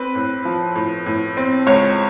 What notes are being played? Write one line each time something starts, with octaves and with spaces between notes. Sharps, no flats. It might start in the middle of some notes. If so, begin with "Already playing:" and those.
Already playing: C4 B4
A2
F3
A2
A2
C4
C#2 C#5